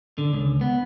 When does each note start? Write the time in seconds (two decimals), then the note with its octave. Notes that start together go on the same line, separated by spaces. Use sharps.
0.18 D3
0.33 C#2
0.61 B3